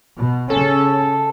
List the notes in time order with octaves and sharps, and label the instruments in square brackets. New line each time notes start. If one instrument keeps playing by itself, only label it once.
[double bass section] B2
[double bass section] C#3 C#4 [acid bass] A4